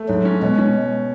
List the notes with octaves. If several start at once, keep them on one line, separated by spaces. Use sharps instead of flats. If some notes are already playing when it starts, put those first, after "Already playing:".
Already playing: A3
G#2 F#3
C#4
B2 G#3
C#4